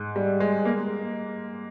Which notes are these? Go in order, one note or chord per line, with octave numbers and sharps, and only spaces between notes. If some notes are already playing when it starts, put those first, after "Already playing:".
Already playing: G#2
G3
G#3
A#3